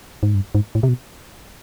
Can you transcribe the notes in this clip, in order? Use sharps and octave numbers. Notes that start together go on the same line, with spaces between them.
G#2
G2
G#2
A2
C3
B2